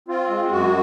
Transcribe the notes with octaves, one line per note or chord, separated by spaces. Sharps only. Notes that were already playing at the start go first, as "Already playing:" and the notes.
C4 F4
G#3
F#2 F#4